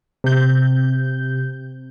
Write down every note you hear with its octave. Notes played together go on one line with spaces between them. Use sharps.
C3 G6